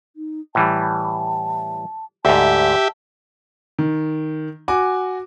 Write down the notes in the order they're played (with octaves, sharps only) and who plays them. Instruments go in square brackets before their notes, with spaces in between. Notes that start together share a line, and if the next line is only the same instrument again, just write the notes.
[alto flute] D#4
[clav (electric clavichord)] A2 E3 G3 [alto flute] A5
[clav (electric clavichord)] D2 G#2 [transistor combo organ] G4 E5 [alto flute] A5
[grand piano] D#3
F#4 G#5 D6